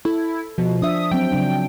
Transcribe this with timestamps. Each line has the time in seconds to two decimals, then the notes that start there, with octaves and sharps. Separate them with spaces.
0.05 E4 A4
0.58 B2 F3
0.82 D4 E5 D#6
1.11 F#3 C4 G5
1.32 C#3 F#3 D4